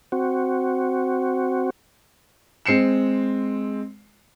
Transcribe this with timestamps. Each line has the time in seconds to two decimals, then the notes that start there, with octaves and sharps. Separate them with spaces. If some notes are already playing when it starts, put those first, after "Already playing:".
0.12 C4 F#4
2.66 G#3 C4 C7 C#7 E7